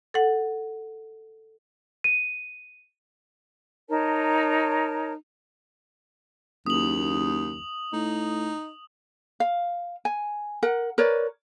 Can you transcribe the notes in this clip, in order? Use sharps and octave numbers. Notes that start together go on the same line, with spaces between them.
A4 F#5
D#7
D#4 A#4 C#5 A5
F#1 D#2 D#6 F#7
A2 D#4
F5
G#5
A#4 F#5
A#4 B4 C#5 D5